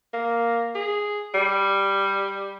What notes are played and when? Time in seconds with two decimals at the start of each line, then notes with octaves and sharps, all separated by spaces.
0.13 A#3
0.75 G#4
1.34 G3